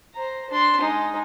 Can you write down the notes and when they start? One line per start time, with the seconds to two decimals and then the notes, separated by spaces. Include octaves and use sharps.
0.14 C5 A#5
0.50 D4 C6
0.80 G#3 D#4